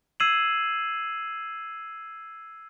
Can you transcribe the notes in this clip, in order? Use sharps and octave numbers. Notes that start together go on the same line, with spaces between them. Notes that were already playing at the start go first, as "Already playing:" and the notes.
E6 G#6 C7 D#7 E7 F#7